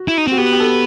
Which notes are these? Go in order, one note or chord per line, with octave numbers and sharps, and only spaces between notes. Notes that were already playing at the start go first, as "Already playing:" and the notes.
Already playing: F#4
E4
D#4
C4 F#4
B3 G4
G4
A4